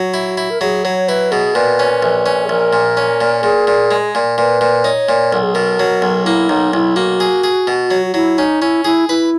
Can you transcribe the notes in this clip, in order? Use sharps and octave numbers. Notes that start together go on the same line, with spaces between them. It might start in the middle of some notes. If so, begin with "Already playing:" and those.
Already playing: F#3 F#4
E4
E4
A#4
F#3 G#4
F#3 C#5
E4 B4
B2 G#4
A#2 B4
C#4
A#1
C#4
G#4
A#1 A#4
A#2
C#4
A#2
A#2 G#4
A#2
G#3
A#2
A#2 B4
A#2
D#4 C#5
A#2
B1 A#4
G#4
B2 A#4
F#3
B1
A#3 E4
B1 D#4
B1 E4
A#3 F#4
G#4
G#4
B2
F#3
F#4
F#3 E4
C#4 D#4
C#4 E4
E4 G#4
E4 B4